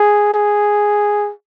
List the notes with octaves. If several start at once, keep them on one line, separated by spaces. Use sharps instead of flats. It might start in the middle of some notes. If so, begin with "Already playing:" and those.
Already playing: G#4
G#4